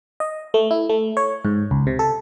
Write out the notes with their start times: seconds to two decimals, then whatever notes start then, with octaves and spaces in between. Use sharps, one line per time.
0.20 D#5
0.54 A3
0.71 E4
0.89 A3
1.17 C#5
1.45 G#2
1.71 C#2
1.87 C3
1.99 A4